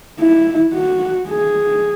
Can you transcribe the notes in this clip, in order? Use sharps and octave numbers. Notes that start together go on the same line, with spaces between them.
E4
F#4
G#4